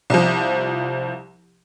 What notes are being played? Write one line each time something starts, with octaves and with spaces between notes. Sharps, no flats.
C2 F3